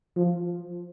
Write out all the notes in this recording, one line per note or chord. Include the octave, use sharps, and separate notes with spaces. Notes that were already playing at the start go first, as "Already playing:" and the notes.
F3